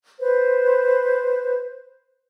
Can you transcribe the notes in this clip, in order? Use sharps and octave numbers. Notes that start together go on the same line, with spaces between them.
B4 C5